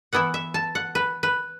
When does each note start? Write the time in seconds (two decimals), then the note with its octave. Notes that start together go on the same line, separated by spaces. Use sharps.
0.13 E3 B3 E4 F#5
0.34 E5
0.54 A5
0.75 F#5
0.95 B4
1.23 B4